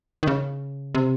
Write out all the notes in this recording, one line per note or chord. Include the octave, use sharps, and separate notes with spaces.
D#3
C#3
C3